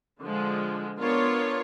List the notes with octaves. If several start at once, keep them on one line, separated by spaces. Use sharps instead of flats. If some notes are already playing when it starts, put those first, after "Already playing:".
D3 F3 G#3
B3 D4 F4 A#4 C#5